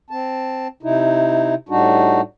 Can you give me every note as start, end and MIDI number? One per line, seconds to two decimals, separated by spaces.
0.10 0.67 60
0.10 0.67 81
0.83 1.55 48
0.83 1.55 63
0.83 1.55 64
1.69 2.21 45
1.69 2.21 55
1.69 2.21 62
1.69 2.21 63
1.69 2.21 66